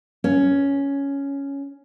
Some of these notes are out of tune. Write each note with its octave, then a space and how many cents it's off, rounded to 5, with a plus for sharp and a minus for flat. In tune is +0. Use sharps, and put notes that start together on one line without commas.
C#4 +5